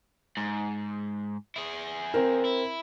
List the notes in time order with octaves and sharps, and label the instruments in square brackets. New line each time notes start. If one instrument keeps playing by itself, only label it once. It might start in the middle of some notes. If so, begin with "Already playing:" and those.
[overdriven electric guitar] G#2
E4 G#4
[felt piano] C4 A#4
[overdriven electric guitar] E4